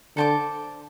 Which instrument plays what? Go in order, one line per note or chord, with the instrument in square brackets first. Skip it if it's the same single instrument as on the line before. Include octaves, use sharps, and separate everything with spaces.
[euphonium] D3 [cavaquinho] A4 C5 A5 D6